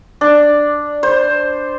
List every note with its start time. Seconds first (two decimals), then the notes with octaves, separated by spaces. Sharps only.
0.21 D4
1.03 C5